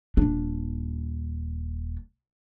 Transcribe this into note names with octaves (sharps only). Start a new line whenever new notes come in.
D#1 D4